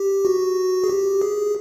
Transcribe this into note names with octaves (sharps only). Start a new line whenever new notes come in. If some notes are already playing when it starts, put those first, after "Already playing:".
Already playing: G4
F#4
G#4
G4
G#4